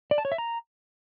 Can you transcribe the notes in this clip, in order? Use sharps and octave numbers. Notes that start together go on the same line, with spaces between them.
D5
A5
C#5
E5
A#5